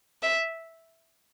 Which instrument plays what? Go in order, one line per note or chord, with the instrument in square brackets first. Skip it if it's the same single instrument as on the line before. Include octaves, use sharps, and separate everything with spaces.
[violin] E5